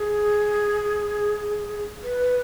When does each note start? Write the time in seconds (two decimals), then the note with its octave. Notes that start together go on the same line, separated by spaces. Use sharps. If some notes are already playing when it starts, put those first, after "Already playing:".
Already playing: G#4
2.03 B4